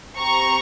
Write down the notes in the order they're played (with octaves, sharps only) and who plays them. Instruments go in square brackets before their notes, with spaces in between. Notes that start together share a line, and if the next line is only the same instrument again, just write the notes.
[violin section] C4 G4 A#5 C#6